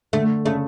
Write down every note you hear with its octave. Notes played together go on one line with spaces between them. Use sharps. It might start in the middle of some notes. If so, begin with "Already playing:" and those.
D3 A3
C#3 A3